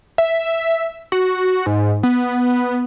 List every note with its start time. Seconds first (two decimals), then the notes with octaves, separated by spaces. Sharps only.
0.18 E5
1.12 F#4
1.66 G#2
2.03 B3